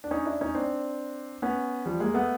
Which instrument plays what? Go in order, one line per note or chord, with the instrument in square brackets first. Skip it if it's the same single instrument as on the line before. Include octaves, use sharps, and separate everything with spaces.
[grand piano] D4
C#4 D#4
D4 E4
C#4 D#4
C4 D4
B3 C#4
F3 G3
G#3 A#3
A3 B3